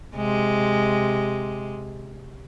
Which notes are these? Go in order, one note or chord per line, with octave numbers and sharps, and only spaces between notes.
C3 G#3